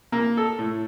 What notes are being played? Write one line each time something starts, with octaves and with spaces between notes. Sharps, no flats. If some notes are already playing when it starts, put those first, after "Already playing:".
A#3
A4
A2